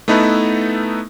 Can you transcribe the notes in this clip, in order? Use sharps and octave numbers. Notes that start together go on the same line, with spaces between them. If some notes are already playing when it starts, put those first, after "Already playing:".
A3 B3 D#4 E4 A4 B4